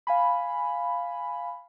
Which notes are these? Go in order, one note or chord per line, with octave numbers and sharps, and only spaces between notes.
F5 G#5 B5